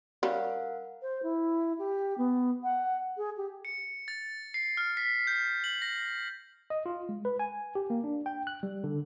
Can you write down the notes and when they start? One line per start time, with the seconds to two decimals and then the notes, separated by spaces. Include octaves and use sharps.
0.23 G3 C#4 A#4 F5 F#5
1.02 C5
1.23 E4
1.79 G4
2.18 B3
2.63 F#5
3.17 G#4
3.37 G4
3.65 C#7
4.08 A6
4.54 C7
4.77 F6
4.97 B6
5.27 G6
5.64 F#7
5.82 A#6
6.70 D#5
6.86 F4
7.09 G#3
7.25 B4
7.39 G#5
7.75 G4
7.90 A#3
8.04 D4
8.26 G5
8.47 F#6
8.63 G3
8.84 D3